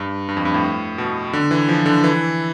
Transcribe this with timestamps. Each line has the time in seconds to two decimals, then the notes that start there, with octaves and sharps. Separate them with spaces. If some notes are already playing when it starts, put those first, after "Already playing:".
Already playing: G2
0.29 G2
0.37 F2
0.45 G2
0.54 A2
0.98 B2
1.33 D3
1.51 E3
1.69 F3
1.86 D3
2.04 E3